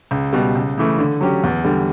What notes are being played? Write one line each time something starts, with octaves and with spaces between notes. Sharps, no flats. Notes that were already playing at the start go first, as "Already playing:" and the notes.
C#2
B2 G3
C#2
C#3 E3 A3
D3
F#3 C#4 G4
E2
D3 G3